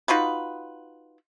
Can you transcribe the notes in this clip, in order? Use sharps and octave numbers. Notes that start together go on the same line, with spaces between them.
D#4 F4 F#4 B4